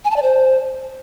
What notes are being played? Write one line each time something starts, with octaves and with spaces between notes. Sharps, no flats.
G#5
A5
D5
C5